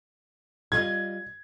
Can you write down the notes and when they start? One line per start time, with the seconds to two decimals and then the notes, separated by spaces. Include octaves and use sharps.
0.72 G3 F4 D#5 G#6